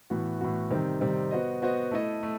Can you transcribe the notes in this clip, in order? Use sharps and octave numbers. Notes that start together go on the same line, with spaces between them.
A2 E3 B3 F#4
A2 E3 B3 F#4
C3 D#3 G3 C4
C3 D#3 G3 C4
B3 F#4 C5 D#5
B3 F#4 C5 D#5
A3 E4 A4 D#5
A3